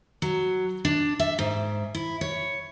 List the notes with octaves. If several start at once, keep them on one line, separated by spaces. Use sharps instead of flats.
F#3
D4
E5
G#2
E4
C#5